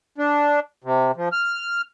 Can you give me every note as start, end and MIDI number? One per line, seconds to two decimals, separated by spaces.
0.18 0.60 62
0.84 1.11 48
1.16 1.29 53
1.32 1.81 89